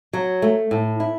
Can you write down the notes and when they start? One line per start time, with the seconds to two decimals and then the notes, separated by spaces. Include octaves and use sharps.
0.13 F#3
0.42 A3
0.71 A2
1.00 E4